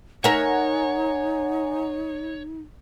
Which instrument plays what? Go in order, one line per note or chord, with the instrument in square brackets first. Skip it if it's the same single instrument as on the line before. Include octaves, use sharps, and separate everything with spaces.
[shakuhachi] D#4 [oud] A#4 E5 [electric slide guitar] C#5 [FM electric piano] F#5 G#5 A#5